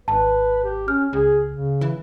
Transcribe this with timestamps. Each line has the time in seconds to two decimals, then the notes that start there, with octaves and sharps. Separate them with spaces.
0.08 G#1 B4 A5
0.64 G4
0.88 C#4 F6
1.13 C#2 G#4
1.51 C#3
1.81 E3